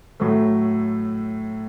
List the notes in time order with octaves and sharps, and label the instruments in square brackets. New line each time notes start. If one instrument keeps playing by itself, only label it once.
[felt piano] A2 F#3 A3